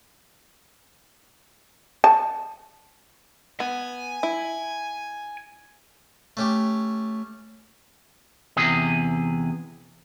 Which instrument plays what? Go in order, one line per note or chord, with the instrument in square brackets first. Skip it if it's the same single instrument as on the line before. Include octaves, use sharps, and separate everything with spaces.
[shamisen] A5
[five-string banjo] B3 [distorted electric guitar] G#5
[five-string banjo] E4
[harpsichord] A3 C#4 G4
[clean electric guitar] E2 C3 G#4